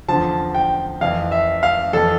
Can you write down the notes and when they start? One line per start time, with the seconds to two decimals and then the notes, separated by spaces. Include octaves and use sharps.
0.08 E2 D3 F3 A5
0.55 G5
1.01 F2 E3 F5
1.31 E5
1.63 F5
1.93 F2 E3 A4